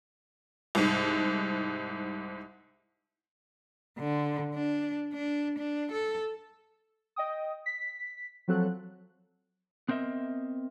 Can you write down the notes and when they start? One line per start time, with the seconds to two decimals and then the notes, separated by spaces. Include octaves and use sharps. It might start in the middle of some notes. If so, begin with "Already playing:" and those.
0.75 C2 G#2
3.99 D3
4.55 D4
5.13 D4
5.58 D4
5.92 A4
7.16 D#5 G5 D#6
7.66 B6
8.48 F3 F#3 C4 A4 F#6
9.89 B3 C4 A#4 D#5 E5